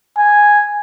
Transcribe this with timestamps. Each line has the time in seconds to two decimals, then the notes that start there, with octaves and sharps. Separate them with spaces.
0.17 G#5